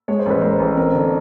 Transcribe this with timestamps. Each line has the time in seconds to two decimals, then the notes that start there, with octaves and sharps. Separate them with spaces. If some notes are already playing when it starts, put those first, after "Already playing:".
0.08 G#3 C#5
0.19 C5
0.26 A1 B4
0.41 G#3 A#4 C5
0.60 A1
0.77 C4 A#4 C5
0.95 D3